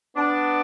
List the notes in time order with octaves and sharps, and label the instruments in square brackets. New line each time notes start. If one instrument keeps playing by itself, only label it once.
[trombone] B3 [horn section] D4